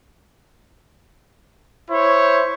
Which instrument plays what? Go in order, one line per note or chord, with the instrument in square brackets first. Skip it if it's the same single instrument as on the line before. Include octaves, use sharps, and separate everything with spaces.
[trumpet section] E4 C5 C#5